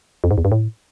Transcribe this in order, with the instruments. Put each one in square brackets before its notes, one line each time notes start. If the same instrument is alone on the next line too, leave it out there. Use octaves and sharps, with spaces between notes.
[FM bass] F2
G#2
E2
G2
A2